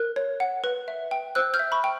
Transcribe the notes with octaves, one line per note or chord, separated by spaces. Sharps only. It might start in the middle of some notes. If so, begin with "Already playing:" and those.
Already playing: A#4 F#6
C#5
F#5
B4
E5
G5
C5 E6 F#6
F6 G6
E5
B5 C#6
G5